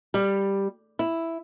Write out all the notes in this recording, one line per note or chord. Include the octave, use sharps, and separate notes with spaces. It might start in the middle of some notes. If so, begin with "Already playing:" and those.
G3
E4